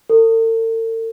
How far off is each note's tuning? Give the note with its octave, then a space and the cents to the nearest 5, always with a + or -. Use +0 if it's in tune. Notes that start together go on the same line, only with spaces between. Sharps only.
A4 +45